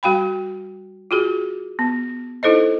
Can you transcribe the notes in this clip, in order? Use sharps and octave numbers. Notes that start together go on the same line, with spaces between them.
G3 F#4 F5 G5 B5
F4 F#4 G#4
B3
D#4 E4 A4 C5 D#5